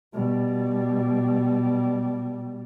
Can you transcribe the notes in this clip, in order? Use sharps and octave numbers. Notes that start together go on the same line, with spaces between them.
B2 G3